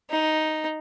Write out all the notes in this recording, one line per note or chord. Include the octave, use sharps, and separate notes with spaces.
D#4